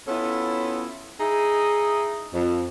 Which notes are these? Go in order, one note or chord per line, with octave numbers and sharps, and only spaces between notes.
B3 C#4 E4 F4 A4
D#4 E4 G#4
F2